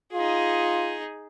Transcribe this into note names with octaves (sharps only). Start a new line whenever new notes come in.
D#4 F4 G#4